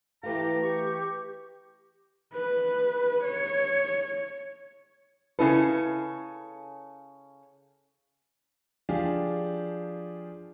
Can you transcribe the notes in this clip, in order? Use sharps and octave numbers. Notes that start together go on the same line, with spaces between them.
E3 A3 G4 B4 F5 A#5
G4 C#6
B4
C#5
C#3 C#4 E4 A4 B4
F3 D4 G4 G#4 F5